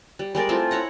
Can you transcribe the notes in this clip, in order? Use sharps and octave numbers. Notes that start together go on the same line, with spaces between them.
G3
G3 G#3 A#4 D5
A3 C4 E4 F4
E4 C#5 F#5 A#5